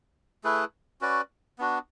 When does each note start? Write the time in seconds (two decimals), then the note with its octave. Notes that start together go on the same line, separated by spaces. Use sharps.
0.44 A3 E4 G#4 B4
1.01 C#4 F#4 B4 D5
1.59 B3 D4 F#4